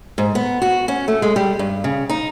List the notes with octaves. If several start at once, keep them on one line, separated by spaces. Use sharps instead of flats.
G#2
B3
F#4
C#4
A3
G#3
G3
G2
C#3
D#4